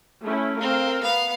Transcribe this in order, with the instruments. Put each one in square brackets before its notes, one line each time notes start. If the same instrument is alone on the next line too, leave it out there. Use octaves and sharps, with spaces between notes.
[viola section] A3 C#4 E4
[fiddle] C4 [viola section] A#4 F5
[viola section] B3 [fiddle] F5